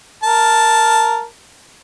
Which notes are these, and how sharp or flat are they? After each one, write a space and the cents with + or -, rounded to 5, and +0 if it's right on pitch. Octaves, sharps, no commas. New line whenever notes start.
A#4 +0 A5 +0